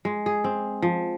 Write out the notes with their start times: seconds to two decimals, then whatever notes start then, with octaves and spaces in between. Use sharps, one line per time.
0.05 G#3
0.26 G#4
0.44 C4
0.82 F3